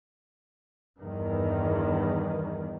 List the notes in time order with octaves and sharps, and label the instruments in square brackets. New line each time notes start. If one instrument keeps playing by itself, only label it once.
[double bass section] E2 G2 D#3